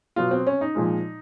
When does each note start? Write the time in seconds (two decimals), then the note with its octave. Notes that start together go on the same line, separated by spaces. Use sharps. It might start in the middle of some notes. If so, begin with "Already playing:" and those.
0.16 B2 F#3 F4
0.31 C4
0.47 C#4
0.61 D#4
0.75 A#2 F3 G#3